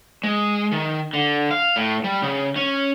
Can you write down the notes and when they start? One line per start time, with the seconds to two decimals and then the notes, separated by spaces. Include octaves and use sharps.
0.23 G#3
0.72 D#3
1.13 D3
1.51 F5
1.76 A2
2.04 G3
2.22 C#3
2.56 C#4